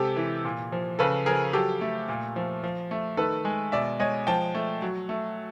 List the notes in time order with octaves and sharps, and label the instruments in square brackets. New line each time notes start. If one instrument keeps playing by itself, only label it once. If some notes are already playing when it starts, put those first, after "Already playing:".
Already playing: [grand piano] C3 G#3 G4 A4
E3
A#2
F3
C#3 A4 B4
F3 G#4 A#4
F#3 G4 A4
A3
A#2
F3
F3
A3
D#3 A4 B4
G#3
B2 D5 E5
G#3 C#5 D#5
F3 G5 A5
A3
F#3
A3